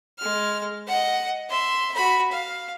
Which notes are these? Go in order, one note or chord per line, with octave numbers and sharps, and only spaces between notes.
G#3 F6
D#5 F#5
E5 C6
F#4 B5
F5